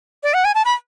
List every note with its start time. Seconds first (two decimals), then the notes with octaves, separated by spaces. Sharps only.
0.23 D5
0.34 F#5
0.44 G#5
0.55 A5
0.65 B5